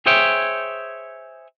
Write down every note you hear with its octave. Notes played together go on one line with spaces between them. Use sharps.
G#4 C5 C#5 E5 G5